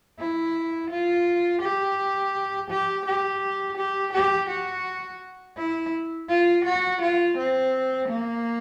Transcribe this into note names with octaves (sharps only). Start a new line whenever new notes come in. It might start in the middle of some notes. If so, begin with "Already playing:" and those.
E4
F4
G4
G4
G4
G4
G4
F#4
E4
F4
F#4
F4
C4
A#3